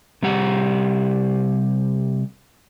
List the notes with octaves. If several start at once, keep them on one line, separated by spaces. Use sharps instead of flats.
C3 G3 G4 F#5